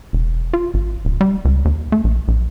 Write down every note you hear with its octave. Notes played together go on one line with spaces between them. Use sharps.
E1
F4
G#1
D1
G3
C#2
D#2
A3
A#1
A#1